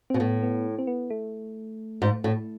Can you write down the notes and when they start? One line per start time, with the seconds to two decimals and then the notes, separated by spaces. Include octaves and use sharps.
0.10 B2 C4
0.19 A2 B3
0.43 B3
0.79 C4
0.87 B3
1.10 A3
2.02 G#2
2.24 A2